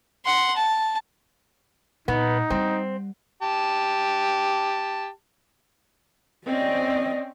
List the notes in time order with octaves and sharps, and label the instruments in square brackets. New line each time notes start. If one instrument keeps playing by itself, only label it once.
[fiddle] F#5 C6
A5
[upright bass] A#2 [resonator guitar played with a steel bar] B3 [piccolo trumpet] D#4
[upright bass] G3 [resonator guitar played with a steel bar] C4
[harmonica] G4 A5
[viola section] C4 C#4 [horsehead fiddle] D5 D#5